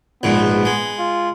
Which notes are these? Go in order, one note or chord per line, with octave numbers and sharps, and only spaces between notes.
A#1 G#2 B2 B3
G#3
F4